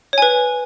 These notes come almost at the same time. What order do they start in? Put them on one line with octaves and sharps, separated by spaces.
C#5 G#5 B4